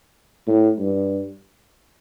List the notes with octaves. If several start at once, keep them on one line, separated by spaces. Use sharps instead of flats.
A2
G2